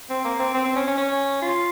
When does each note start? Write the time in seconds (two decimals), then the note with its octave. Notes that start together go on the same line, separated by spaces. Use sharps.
0.10 C4
0.25 A#3
0.39 C4
0.54 C4
0.65 C4
0.76 C#4
0.87 C#4
0.98 C#4
1.42 F4